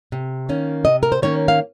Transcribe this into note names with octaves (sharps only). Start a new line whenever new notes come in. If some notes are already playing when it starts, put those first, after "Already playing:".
C3
D#3 A#3 C#4
C3 D#5
A#4
C5
D#3 A#3 C#4 C#5
F5